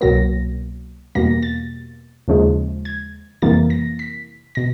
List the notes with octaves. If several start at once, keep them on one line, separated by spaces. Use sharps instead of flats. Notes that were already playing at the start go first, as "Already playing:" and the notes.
C2 B2 F#3 A#3 A#6
E2 B2 G3 A#3 A#6
A6
D#2 C#3 F3 G#3
G#6
F2 C3 E3 G3 A#3 A6
A#6
B6
B2 A#6